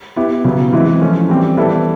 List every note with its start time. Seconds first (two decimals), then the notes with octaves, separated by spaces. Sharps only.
0.16 B3 E4 G4
0.44 C#3 F#3 B3
0.73 E3 G#3 C4 E4
1.01 F3 A3 C#4
1.29 E3 G3 C4 E4 G4
1.57 E3 G3 B3 E4 A4